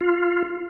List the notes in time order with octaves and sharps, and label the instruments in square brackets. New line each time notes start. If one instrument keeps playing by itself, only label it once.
[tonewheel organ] F4